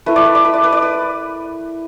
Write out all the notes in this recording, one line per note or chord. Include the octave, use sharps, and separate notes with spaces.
A3 E4 B4
D5
B4
D5
B4
D5
B4
D5
B4